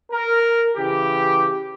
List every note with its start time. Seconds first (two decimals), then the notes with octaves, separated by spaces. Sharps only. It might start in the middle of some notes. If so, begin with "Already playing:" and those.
0.12 A#4
0.76 C#3 E3 G4